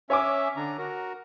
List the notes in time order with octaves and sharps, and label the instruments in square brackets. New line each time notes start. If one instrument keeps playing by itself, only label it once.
[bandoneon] C#4 E5 [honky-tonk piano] C#5 G#5 D6
[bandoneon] D3 D4 A#5
F#4 A#4